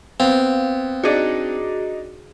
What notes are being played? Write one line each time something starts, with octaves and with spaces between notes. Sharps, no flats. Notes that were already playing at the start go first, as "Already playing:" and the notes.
B3 C4 F5
D4 D#4 F#4 G#4 D5